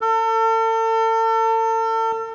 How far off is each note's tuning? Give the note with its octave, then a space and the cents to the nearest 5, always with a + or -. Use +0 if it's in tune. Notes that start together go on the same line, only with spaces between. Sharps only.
A4 +40